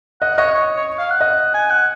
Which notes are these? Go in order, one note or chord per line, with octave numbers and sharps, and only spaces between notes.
D#5 F#5
C#5 D#5
C#5
C#5
F5
F#5
D#5
G#5
F#5